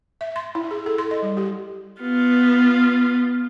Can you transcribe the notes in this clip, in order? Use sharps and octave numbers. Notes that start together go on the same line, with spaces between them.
E5
C6
E4
G#4
A4
C6
D#5
G3
G4
B3 F4